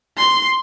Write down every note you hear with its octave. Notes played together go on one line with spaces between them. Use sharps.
C6